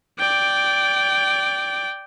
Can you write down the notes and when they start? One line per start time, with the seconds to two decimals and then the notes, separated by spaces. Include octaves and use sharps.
0.19 D5 G5